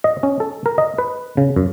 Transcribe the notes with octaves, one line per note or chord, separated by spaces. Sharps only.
D#5
C#4
A4
A#4
D#5
B4
C#3
F#2